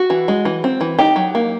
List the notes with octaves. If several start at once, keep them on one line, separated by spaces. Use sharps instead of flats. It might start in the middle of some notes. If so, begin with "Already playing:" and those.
Already playing: F#4
E3
G#3
E3
C4
E3
D#4 G4
F#3
A#3